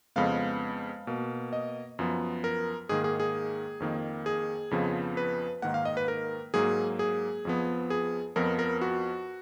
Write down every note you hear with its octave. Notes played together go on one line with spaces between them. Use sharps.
F2 C#3 G#3 B3 F5
B2 A#3
D#5
F#2 F3 B3
A#4
G#2 D#3 A#3 G#4
G#4
G#4
F2 D#3 A#3
G#4
F2 C#3 F3 B3
B4
G#2 D#3 A#3 F#5
F5
D#5
B4
A#4
G#2 F#3 A#3 G#4
G#4
F2 F3 B3
G#4
F2 F3 B3 A#4
A#4
F#4